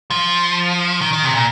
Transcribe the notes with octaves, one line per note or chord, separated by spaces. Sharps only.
F3
D#3
D#3
C3
A#2